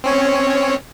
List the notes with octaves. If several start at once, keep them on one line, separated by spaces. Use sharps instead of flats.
C4 C#4 C#5